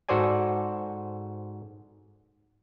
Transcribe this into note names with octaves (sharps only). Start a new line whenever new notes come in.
G#2 F#4 A4 C5 D5 G#5